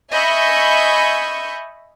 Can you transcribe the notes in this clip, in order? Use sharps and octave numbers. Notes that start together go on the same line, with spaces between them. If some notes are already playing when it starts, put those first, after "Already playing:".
D#5 E5 G#5 B5 C#6 G6